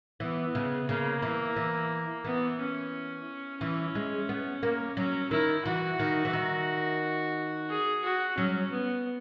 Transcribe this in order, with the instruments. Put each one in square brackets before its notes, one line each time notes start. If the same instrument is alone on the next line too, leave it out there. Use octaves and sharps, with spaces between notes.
[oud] E3 [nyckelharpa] B3
[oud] C#3
[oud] C#3 [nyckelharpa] A#3
[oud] E3
E3
[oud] E3 [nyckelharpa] B3
[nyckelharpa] C#4
[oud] E3 [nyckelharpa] C#4
[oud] G#3
B3
A#3
[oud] F#3 [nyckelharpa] C#4
[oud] D#3 [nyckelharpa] E4
[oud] E3 [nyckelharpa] F#4
[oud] D#3
E3
D#3
[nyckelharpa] G#4
F#4
[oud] F#3 [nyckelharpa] C#4
[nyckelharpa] B3